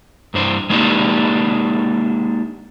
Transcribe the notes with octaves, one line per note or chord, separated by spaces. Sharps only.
G2 D4 C5
G#3 A#3 D4 D#4 F#4 G4